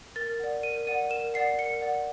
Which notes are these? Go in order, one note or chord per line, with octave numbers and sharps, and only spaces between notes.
A#4 A6
D5 F#5
A#4 D#7
D5 F#5 D#7
A#4 E7
D5 F#5 C7
A#4 C#7
D5 F#5